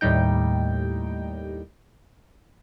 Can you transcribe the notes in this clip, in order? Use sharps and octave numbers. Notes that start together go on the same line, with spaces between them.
D#2 A2 G3 D#4 G5